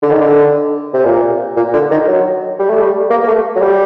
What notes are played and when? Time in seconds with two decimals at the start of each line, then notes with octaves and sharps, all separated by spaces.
0.02 D3
0.11 D#3
0.20 D3
0.94 C3
1.05 A#2
1.56 A#2
1.74 D3
1.91 D#3
2.07 F#3
2.59 G3
2.69 A3
2.81 G3
3.10 A#3
3.23 A#3
3.27 A3
3.56 F#3
3.61 G3